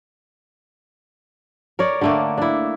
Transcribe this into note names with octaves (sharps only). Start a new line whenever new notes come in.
A#4 C#5 D5
D3 A3 A#3
D4 E4